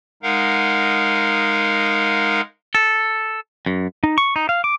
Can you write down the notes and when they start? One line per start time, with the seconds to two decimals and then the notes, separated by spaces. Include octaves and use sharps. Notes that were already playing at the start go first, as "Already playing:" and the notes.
0.23 G#3 D#4 A#4 F5 F#5
2.75 A4
3.66 F#2
4.04 D#4
4.18 C#6
4.36 D#4
4.49 F5
4.64 D6